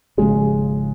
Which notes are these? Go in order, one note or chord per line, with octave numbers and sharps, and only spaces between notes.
G#1 F#2 C#3 F3 G#3